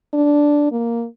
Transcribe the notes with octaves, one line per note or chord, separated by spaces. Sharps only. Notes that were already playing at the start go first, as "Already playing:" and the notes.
D4
A#3